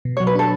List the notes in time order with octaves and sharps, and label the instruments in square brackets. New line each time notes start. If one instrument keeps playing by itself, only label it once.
[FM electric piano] B2
[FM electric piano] F#3 [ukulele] C#5
[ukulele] B4
[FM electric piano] D4 [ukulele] A4